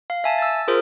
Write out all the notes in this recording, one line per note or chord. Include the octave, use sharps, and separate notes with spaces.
F5
E5 G#5 A5
E6 A6
F4 G#4 A#4 C5